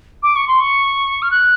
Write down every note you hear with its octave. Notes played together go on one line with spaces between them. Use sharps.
D6
C#6
C6
C#6
F6
F#6